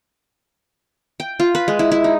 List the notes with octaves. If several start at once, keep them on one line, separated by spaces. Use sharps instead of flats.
G5
F4
B4
G#3
E4
E4
D#4